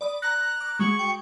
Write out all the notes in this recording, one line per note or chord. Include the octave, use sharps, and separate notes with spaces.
D5 B5 D#6
A#5 F#6 A#6
D6
G#3 F#4 C#6
G5